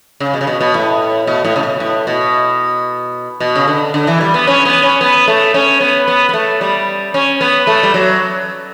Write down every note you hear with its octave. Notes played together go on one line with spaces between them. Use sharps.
C#3
B2
C#3
B2
B2
A2
B2
A2
C#3
B2
A2
B2
B2
C#3
D3
D3
E3
G3
B3
C#4
B3
C#4
B3
A3
C#4
B3
B3
B3
A3
G3
C#4
B3
A3
G3
F#3